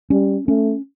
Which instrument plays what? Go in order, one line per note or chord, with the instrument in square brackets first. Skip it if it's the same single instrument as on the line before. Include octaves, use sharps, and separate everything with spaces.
[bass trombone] G3 [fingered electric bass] C#4
[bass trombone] A3 [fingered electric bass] C#4